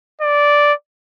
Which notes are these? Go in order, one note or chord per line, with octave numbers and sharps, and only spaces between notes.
D5